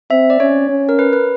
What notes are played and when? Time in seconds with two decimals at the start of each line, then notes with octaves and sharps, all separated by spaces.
0.10 C4 E5
0.30 D5
0.40 C#4 C#5
0.70 C#4
0.89 A#4
0.99 B4
1.13 B4